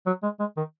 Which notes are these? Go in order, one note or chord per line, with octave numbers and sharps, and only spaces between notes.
F#3
G#3
G#3
D#3